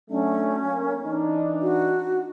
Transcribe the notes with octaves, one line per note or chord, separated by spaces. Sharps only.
F#3 A3 C#4 D4
A#3
E3 D4 D#4
F#4